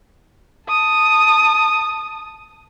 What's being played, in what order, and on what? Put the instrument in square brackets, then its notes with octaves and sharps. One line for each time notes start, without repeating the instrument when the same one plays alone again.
[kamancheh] A5 D#6